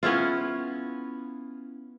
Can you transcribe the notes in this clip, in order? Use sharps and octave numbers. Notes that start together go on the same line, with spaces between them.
B3 C#4 E4 F4